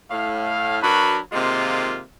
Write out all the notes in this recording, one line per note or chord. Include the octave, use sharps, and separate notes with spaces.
A2 F5
F#3 D4 F#4 A#4 B4 B5
C3 D#3 G#3 A#3 F4